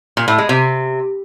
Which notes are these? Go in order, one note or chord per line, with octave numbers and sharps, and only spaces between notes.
A#2
A2
G#3
C3